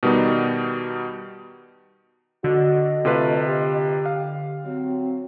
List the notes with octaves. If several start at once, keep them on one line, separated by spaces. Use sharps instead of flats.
B2 D#3 G3 B3 D#4
D3 F#4 D#5
C3 A3 F4 B4
G4
F5
F#3 C4